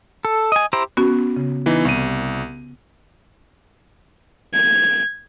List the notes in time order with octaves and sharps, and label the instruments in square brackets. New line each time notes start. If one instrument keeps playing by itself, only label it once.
[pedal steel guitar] A4
D#5 G#5
E4 G4 C5 G5 A#5
[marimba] B3 C#4 F#4
C#3
[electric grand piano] E3 D#4 [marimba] B3
[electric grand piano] C2 D#7
[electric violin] G#6